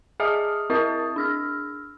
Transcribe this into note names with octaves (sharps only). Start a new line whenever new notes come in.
G#4 D#5 E5 G#5 D#6 F6
C4 E4 A#4 D#5 D#6 A6
D4 E6 F6